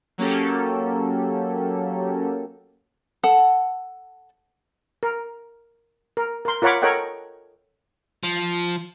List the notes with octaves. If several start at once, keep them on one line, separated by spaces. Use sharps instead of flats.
F#3 A#3 C#4 G4 A4
A4 F#5 A5
A#4
A#4
A#4 C6
F4 A#4 C#5 F#5 B5 D6
A4 A#4 C#5 D#5 F#5 G5
F3